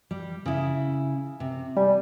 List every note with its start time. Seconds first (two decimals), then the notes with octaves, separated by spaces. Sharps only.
0.11 G3
0.46 C#3 E4
1.40 C3
1.76 G3 G#5